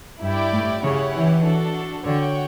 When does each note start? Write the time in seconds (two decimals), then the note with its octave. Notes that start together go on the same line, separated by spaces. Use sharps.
0.22 G2 E4 G4 D5 G5
0.52 A2
0.82 C#3 C#4 E4 G4 C#5 F#5
1.13 E3
1.43 D4 F#4 A4
2.05 D3 F#4 C#5 G5